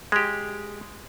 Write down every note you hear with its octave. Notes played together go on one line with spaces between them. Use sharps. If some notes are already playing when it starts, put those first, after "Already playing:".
G#3 G4